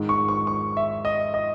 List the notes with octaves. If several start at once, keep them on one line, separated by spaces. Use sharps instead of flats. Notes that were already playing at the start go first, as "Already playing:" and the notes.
Already playing: G#2 D#3 G#3
C#6
C#6
C#6
E5
D#5
D#5